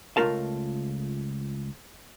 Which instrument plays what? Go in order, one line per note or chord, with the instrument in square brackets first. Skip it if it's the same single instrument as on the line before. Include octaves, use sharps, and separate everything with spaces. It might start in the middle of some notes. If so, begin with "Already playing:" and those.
[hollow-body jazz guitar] C#2 E3 A3 F4 A#4 A5